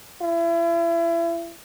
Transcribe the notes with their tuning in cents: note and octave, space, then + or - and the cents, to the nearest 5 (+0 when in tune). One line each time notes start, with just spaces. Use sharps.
E4 +35